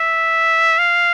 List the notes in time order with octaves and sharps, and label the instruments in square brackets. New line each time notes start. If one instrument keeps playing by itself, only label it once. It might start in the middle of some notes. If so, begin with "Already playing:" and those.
Already playing: [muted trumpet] E5
F5